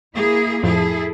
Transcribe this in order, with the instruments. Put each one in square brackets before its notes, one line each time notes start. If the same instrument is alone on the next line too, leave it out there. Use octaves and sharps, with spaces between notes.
[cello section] A#3 E4 G#4
[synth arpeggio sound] F2 A2 F3 [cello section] E4 G#4 A4